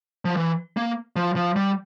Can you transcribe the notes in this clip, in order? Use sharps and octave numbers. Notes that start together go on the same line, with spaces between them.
F3
E3
A#3
F3
F3
G3